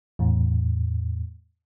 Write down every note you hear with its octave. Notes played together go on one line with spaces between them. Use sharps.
E2 A2